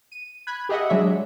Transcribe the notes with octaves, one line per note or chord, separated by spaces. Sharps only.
D#7
B5 F#6 G#6
G4 G#4 D#5 E5 F#5
F#3 G#3 D4 C#5 E5